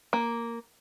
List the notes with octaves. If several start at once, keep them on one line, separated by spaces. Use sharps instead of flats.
A#3